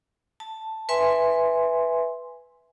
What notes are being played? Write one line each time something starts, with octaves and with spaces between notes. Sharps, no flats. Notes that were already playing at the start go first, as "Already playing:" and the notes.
A5
B4 E5 G#5 C6